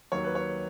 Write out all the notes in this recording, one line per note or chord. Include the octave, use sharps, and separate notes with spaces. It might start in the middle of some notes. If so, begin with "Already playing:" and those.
D#2 D#3 F#3 C#5
B4
C#5